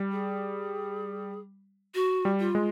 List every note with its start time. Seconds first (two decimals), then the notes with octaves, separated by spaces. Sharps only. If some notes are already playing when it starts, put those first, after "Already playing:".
Already playing: G3
0.12 G#4
1.95 F#4
2.25 G3
2.40 F4
2.55 G#3